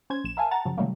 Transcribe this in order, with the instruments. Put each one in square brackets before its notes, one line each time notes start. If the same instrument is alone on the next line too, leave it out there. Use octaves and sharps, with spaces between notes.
[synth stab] C#4 C5 G#6
A#1 E7
A#4 E5 F5 G#5 A5
F#5 A5 A#5 A6
F#2 C#3 F3 F#3
C3 D#3 F#3 G3 A3 A#3